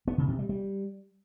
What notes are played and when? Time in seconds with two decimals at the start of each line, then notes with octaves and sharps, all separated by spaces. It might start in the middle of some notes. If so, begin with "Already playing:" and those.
0.07 B3
0.18 C#3
0.28 C3
0.39 G3
0.49 G3